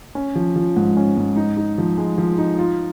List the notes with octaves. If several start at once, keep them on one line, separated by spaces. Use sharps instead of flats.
C#4
F3
F3
G#2
C#4
G#2
D#4
D#4
F3
G#3
F3
D#4
F4